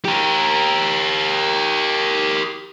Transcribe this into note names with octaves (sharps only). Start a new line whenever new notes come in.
G4 A#4